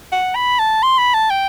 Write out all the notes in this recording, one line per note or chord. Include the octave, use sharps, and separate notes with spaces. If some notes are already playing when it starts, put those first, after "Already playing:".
F#5
B5
A5
C6
B5
A5
G5